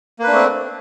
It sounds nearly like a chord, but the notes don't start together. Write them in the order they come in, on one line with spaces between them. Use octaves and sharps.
A#3 B4 D4 A3 C4